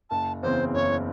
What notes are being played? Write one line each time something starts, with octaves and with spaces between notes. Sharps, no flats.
F#1 A5
E2 C#3 E3 C4 C5
F#1 C#5